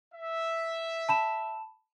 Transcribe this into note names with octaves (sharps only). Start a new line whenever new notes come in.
E5
A5 B5 E7